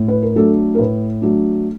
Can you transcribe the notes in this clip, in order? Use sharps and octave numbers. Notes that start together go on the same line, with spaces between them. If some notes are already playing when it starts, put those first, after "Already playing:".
Already playing: A2
B4
A#4
F#3 A3 D4 A4
A#4
A2 B4
F#3 A3 D4